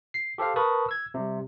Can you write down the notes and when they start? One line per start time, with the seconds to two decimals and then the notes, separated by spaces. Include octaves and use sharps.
0.14 C7
0.38 G4 A4 C5 F5
0.56 A#4 B4 A5 B5 C#6 D#6
0.89 E6 G#6
1.14 C3 G3